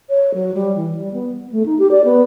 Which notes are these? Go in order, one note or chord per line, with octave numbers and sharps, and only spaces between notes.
C#5
F#3
G3
E3
G3
B3
A3
D#4
G4
D5
B3